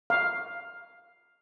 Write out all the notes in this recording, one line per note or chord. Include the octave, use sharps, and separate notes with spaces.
F5